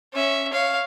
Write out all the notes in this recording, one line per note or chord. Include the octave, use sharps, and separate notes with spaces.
C#4 E5
C#5 F5